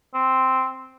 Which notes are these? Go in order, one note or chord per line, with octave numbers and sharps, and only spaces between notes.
C4